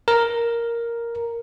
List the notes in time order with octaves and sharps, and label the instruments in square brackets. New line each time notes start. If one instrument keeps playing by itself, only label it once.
[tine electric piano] A#4